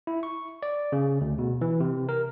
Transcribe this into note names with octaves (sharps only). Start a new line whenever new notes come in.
E4
C#6
D5
C#3
D2
B2
E3
C3
A#4